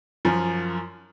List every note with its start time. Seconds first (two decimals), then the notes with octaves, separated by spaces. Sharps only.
0.25 F#2 F3